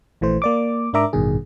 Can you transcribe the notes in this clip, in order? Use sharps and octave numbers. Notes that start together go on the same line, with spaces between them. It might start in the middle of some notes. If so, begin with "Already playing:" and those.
A#1 E3 A3 C5
A#3 D5 D6
G#2 D4 A#4 E5 A#5 D6
A1 G2 B2 D#3 G#4